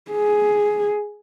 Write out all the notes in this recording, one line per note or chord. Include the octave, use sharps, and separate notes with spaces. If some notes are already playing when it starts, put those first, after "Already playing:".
G#4